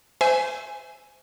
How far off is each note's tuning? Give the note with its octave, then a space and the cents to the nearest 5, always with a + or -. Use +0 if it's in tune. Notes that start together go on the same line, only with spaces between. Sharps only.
C5 -30 E5 +0 G#5 +0